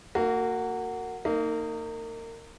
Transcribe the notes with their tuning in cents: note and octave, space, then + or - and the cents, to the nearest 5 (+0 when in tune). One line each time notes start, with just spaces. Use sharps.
A#3 -30 F#4 +0
A#3 -30 D#4 +0